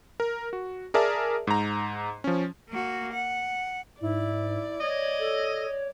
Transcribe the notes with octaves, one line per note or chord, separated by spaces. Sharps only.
A#4
F#4
G#4 A#4 D5 E5 A5
G#2 A#5
F3 C#4
A#3 F#4
F#5
G#2 E4 D5
C#5 D#5
A4